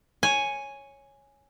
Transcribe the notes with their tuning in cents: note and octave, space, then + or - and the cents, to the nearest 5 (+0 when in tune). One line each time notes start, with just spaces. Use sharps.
C#5 +0 G#5 +0